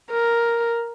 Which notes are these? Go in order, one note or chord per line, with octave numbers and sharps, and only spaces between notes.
A#4